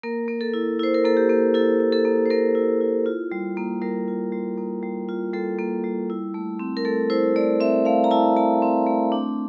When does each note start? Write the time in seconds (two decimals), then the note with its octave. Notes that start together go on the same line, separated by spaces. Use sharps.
0.03 A#3 A#4
0.28 A#3
0.41 A4
0.54 E4
0.79 E4 C5
0.94 A#4
1.05 A#3 A4
1.17 G4
1.30 A#3
1.54 E4 A4
1.80 E4
1.92 A4
2.05 A#3
2.26 C5
2.30 A#3 A#4
2.55 E4
2.81 E4
3.06 F4
3.32 G3
3.57 A#3
3.82 G3 A#4
4.08 F4
4.32 G3
4.58 A#3
4.83 G3
5.09 F4
5.33 G3 A4
5.59 A#3
5.84 G3
6.10 E4
6.34 A3
6.59 C4
6.77 A#4
6.85 A3 A4
7.10 E4 C5
7.36 A3 D5
7.60 C4 E5
7.85 A3 F5
8.04 A#5
8.11 E4 A5
8.36 A3 A5
8.62 C4
8.87 A3
9.12 D4